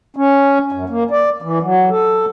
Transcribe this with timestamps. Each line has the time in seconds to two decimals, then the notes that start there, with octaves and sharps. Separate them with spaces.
0.16 C#4
0.72 F#2
0.90 A#3
1.11 D5
1.42 E3
1.62 F#3
1.90 A4